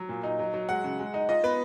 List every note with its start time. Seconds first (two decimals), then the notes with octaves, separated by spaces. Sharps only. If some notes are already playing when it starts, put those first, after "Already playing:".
Already playing: F#3
0.09 A#2
0.24 D#4
0.39 F#3
0.54 F#3
0.69 G#3 F#5
0.84 C#3
0.99 G#3
1.14 D#4
1.29 F4 D#5
1.43 B3 B4